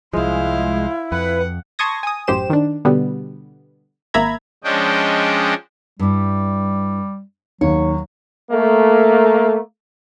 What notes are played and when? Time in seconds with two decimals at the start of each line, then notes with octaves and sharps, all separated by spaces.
0.13 C2 F3 G#3 E4 C5 F5
1.12 F2 B4 F#5
1.79 A5 C6 C#6 D#6 G#6 A#6
2.03 G#5 D#6
2.27 A1 F#2 G4 C5 E7
2.50 D#3 D4
2.85 B2 D3 G3 B3
4.14 G#1 A#3 E5 A#5 B5 G#6
4.64 F3 G#3 C#4 D4 D#5 G5
5.99 G2 G3 E4
7.61 D#2 F#3 C#5
8.51 A3 A#3